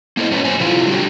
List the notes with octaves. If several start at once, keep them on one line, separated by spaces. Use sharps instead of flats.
A#3 E4 A4 C5 D#5
F#2 C#4 G4 B4
F#2 F3 C5 G#5
A2 C3 F3 A3 E4 F4
D3 G3 D#4 F#4 G4